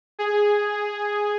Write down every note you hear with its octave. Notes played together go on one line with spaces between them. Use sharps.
G#4